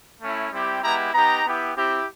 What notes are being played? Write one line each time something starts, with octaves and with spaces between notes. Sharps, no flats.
A3 C#4 E4
G3 C4 E4 G4
G#3 B3 E4 G4 A#5
B3 D#4 G4 A#5
B3 E4 G4
C4 E4 G4